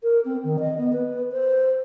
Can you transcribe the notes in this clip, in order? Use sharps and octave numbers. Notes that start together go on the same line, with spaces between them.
A#4
C4
D#3
D#5
B3
B4
C5